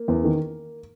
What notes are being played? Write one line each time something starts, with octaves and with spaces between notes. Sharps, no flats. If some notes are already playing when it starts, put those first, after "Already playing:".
Already playing: A#3
E2
D#3